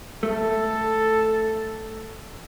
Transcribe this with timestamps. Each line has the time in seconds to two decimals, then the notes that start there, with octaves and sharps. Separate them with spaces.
0.23 A3 A4